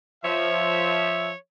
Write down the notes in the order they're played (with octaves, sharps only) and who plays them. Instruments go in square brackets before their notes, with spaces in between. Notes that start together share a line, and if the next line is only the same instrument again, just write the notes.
[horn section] F3 E5 [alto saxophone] C#5